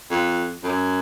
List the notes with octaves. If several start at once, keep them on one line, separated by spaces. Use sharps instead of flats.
F2
F#2